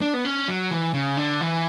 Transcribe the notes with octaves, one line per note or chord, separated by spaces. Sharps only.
D4
B3
C#4
F#3
E3
C#3
D3
E3